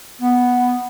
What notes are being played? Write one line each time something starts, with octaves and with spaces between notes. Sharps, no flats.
B3